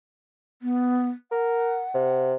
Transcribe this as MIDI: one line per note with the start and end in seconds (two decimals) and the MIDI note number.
0.62 1.08 59
1.32 1.84 70
1.32 2.26 78
1.94 2.35 48